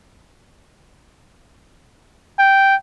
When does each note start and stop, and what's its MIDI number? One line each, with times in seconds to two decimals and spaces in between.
2.39 2.76 79